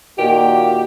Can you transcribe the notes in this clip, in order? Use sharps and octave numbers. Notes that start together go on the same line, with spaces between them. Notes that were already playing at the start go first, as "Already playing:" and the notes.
A#2 D#3 A#3 F#4 G4